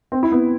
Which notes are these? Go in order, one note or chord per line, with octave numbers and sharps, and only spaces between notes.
C4
E4
B3